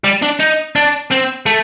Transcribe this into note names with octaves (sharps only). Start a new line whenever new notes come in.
G3
D4
D#4
D4
C4
A3